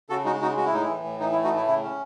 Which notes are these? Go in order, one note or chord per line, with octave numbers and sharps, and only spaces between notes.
C#3 F#4 A4
G#3 D#4 F#4
C#3 D#4 F#4
G#3 F#4
E4
A2 D#4
E4
E3
A2
E3 D#4
E4
A3
D#4 F#4
A2
E4
C#3 E4
C#4